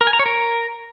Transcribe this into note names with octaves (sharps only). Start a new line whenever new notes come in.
A#4
G#5
A#5
C#5
A#4